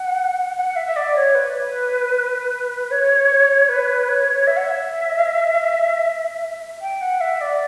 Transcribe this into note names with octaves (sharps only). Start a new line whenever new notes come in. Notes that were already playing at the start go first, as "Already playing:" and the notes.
Already playing: F#5
F#5
E5
E5
D5
C#5
B4
C#5
B4
C#5
E5
F#5
E5
G5
F#5
E5
D5